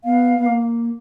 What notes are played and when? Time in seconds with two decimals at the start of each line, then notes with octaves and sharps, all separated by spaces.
0.04 B3 F5
0.38 B3
0.46 A#3